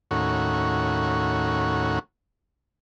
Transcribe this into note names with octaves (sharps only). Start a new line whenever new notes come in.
D#2 A2 C#4 F#4